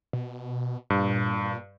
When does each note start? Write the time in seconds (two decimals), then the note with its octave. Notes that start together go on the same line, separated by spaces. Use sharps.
0.13 B2
0.90 G2 A#2